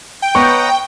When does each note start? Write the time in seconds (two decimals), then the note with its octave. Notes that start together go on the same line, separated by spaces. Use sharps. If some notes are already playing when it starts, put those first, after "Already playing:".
0.22 G5
0.35 B3 B4 C#5 D#5 F#5 A#5 C#6